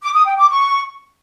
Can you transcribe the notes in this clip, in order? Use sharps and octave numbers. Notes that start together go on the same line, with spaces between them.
D6
D#6
G5
D6
C#6